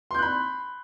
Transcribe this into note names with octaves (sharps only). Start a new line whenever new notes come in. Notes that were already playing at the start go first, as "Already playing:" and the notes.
B5 C6 F#6 G6